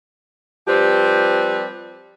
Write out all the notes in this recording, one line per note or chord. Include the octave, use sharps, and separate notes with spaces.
F3 G3 C4 G4 B4